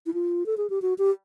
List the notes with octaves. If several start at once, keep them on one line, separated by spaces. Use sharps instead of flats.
E4
F4
A4
G#4
G4
F#4
G4